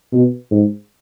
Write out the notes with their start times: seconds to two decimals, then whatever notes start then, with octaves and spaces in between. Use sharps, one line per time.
0.12 B2
0.51 G#2